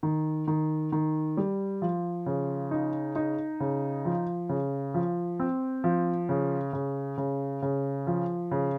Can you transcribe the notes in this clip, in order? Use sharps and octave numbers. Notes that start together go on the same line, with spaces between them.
D#3
D#3
D#3
G3
F3
C#3
D#4
D#4
C#3
F3
C#3
F3
C4
F3
C#3
C#3
C#3
C#3
F3
C#3